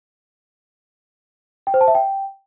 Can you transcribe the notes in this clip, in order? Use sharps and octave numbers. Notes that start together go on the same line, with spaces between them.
G5
C5
A5
E5
G5